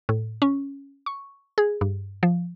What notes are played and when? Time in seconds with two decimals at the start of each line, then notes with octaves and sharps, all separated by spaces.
0.09 A2
0.42 C#4
1.06 C#6
1.58 G#4
1.81 G2
2.23 F3